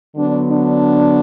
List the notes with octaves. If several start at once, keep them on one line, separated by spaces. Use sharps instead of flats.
D3 F#3 B3 D4
D4